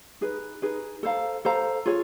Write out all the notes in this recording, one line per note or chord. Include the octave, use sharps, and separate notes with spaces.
D#4 G#4 B4
D#4 G#4 B4
A4 C5 F5 A#5
A4 C5 F5 A#5
F4 G#4 C#5